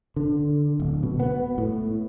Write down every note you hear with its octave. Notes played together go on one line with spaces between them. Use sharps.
D3
D1
B2
B3
A2